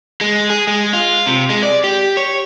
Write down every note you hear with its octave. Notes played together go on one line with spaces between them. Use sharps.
G#3
G#4
G#3
F4
C3
G#3
D5
G4
C#5